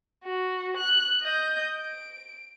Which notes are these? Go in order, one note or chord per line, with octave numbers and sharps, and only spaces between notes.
F#4
F#6
D#5 G6
D7